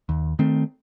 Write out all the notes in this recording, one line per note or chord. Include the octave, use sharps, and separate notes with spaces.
D#2
D#3 A3 C4